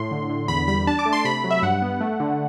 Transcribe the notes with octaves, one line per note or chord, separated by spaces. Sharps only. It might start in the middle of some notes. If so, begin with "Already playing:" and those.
Already playing: A2 C6
D3
D3
E2 B5
G3 B5
D4 A5
D6
A3
C6
C3 B5
F#3
E5
G2 F#5
B3
A3
D3